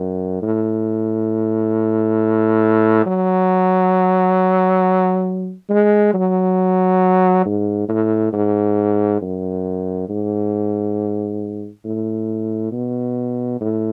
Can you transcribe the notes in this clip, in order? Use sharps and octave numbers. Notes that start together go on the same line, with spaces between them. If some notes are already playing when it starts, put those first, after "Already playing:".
Already playing: F#2
A2
F#3
G#3
F#3
G#2
A2
G#2
F#2
G#2
A2
B2
A2